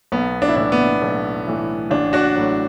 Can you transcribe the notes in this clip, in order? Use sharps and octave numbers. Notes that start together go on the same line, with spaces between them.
B1 B3
D4
E4
A2 E3 D4
B3
B1
A2 E3
A1 D4
D4 F#4
A2 F#3